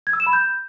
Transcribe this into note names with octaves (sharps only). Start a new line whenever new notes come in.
G#6
E6
E7
B5
G6